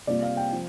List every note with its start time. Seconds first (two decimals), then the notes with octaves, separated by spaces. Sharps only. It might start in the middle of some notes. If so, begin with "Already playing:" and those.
0.07 C3 G3 A#3 F4 D5
0.23 F5
0.37 G5
0.52 F3